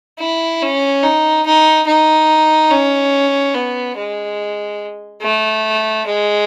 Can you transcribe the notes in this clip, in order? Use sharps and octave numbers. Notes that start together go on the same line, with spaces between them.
E4
C#4
D#4
D#4
D#4
C#4
B3
G#3
A3
G#3